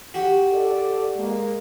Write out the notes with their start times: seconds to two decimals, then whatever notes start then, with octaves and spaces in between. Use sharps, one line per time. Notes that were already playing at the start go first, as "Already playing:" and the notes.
0.14 F#4 G4
0.52 A4 D5
1.16 G#3 A#3